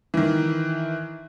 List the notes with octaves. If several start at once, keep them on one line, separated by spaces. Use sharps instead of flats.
D#3 E3